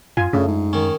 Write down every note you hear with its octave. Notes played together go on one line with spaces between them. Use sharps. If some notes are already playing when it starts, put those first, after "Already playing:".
F#2 F4 G#5
F#2 C#3 A3 D4
G#2
D#3 C#4